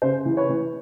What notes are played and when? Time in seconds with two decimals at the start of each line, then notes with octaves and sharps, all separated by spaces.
0.02 C#3 C5
0.25 E3
0.37 B4 C#5
0.49 E3